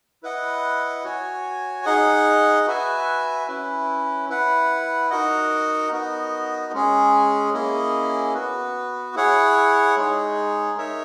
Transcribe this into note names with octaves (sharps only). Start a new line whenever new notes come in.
E4 B4 D#5 F#5
F#4 C#5 G#5
D#4 G#4 D#5 F#5
F#4 B4 E5 G#5
C#4 E4 B4
E4 B4 F#5
D#4 F#4 A#4 D#5 F#5
B3 D#4 F#4 A#4 D#5
G#3 C#4 G#4
A#3 C#4 E4 G#4 D#5
B3 F#4 B4
E4 G#4 C#5 F#5
G#3 D#4 G#4 C#5
D#4 A#4 C#5 E5